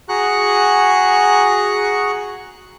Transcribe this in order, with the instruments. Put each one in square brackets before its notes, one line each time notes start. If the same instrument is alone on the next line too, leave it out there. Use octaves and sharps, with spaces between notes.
[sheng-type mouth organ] F#4 G#4 A#5 C#6 F#6